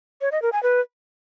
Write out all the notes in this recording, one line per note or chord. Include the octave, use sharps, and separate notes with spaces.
C#5
D#5
A#4
G#5
B4